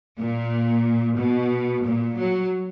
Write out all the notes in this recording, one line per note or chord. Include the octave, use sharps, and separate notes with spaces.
A#2
B2
A#2
F#3